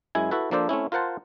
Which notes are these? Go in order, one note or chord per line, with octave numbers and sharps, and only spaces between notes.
F#2 G#3 E4 G#5
E4 F#4 A4 B4
F3 A#3 D4 A4 C5 D5
A3 C4 C#4 E4
F4 A#4 C5 F#5 A5